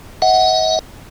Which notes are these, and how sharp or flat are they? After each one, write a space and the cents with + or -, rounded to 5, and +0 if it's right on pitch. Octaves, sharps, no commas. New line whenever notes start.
D#5 +40 F#5 +5